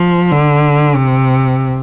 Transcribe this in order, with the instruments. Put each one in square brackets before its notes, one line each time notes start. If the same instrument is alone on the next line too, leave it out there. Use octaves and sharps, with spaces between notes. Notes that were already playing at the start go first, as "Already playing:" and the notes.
Already playing: [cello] F3
D3
C3